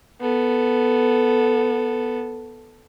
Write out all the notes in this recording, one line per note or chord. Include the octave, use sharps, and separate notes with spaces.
B3 A4